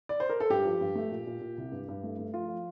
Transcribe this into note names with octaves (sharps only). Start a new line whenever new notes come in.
D5
C5
A#4
A4
G2 G4
F3
G2
A3
A#2
A#2
A#2
C2
G2
G2
A3
A3
F3 F4
F3